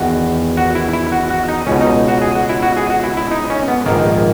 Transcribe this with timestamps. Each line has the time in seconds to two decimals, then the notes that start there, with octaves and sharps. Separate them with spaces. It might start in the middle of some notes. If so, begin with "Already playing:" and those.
Already playing: E2 D#3 F#4
0.57 F#4
0.75 E4
0.93 E4
1.12 F#4
1.30 F#4
1.48 D#4
1.67 C#2 B2 C#4
1.81 D#4
2.08 F#4
2.22 G#4
2.35 F#4
2.49 E4
2.62 F#4
2.77 G#4
2.90 F#4
3.03 E4
3.17 E4
3.31 D#4
3.50 C#4
3.68 B3
3.86 A#1 G#2 D#3 A#3